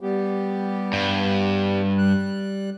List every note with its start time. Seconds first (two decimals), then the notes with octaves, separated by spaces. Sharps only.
0.01 G3 B3 G4
0.93 G2
1.98 G3 F#6